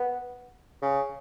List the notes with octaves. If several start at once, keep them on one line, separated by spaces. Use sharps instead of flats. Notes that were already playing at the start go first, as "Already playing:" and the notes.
Already playing: B3
C#3